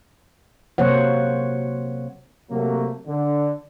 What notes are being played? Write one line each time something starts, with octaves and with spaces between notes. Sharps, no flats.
C3 F#3 A#3 C5 C#5 F#5
C3 F#3 A3 A#3
D3